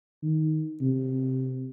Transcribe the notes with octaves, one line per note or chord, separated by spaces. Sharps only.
D#3
C3